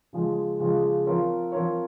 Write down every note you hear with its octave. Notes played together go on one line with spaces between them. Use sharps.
C#3 F3 G#3
C#3 F3 G#3
F3 C4 F4 A#4 C#5
F3 C4 F4 A#4 C#5